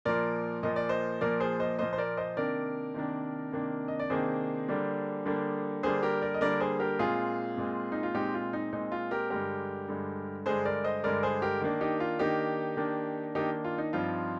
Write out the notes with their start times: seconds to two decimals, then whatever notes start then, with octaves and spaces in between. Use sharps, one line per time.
0.05 A#2 F3 A#3 A#4 D5
0.63 A#2 F3 A#3 D#5
0.76 D5
0.89 C5 D#5
1.21 A#2 F3 A#3 A#4 D5
1.40 G#4 C5
1.60 C5 D#5
1.79 A#2 F3 A#3 C5 D#5
1.93 C5
1.98 A#4 D5
2.17 C5 D#5
2.37 C3 D#3 A#3 D4 A#4 D5
2.94 C3 D#3 A#3 D4
3.52 C3 D#3 A#3 D4
3.88 D#5
4.00 D5
4.10 C3 D#3 A#3 D4 G#4 C5
4.68 D3 G3 A#3 D4
5.25 D3 G3 A#3 D4
5.83 D3 G3 A#3 D4 G#4 C5
6.03 G4 A#4
6.22 A#4 D5
6.34 D#5
6.41 D3 G3 A#3 D4 A#4 D5
6.60 G#4 C5
6.80 G4 A#4
6.99 A#2 G#3 C4 F4 G#4
7.57 A#2 G#3 C4
7.92 D#4
8.03 F4
8.14 A#2 G#3 C4 D#4 G4
8.34 F4
8.53 D#4
8.73 A#2 G#3 C4 D#4
8.92 F4
9.11 G4 A#4
9.30 G2 D3 G#3 G4 A#4
9.88 G2 D3 G#3
10.46 G2 D3 G#3 G#4 C5
10.65 A#4 D5
10.84 C5 D#5
11.04 G2 D3 G#3 A#4 D5
11.23 G#4 C5
11.42 G4 A#4
11.61 D#3 A#3 D4
11.81 D#4 G4
12.00 F4
12.19 D#3 A#3 D4 D#4 G4
12.77 D#3 A#3 D4
13.35 D#3 A#3 D4 D#4 G4
13.64 F4
13.78 D#4
13.93 G2 F3 C4 D#4 F4